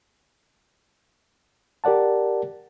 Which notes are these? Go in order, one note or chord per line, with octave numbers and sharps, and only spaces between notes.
G4 A#4 D5 F#5 A5